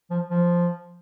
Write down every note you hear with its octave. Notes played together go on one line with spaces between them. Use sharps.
F3
F3